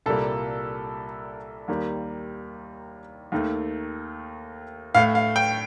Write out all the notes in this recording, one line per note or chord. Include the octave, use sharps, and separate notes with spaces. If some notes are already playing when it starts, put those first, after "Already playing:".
C2 A#2 G3 A#3 A4
D#2 D#3 G3 A#3
D#2 D#3 A3
A2 A3 F5
F5
G5